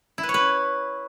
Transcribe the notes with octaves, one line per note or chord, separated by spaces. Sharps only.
E4
B4
C#5
B4